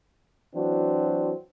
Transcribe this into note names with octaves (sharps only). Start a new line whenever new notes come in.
E3 F#3 C4 D4 F#4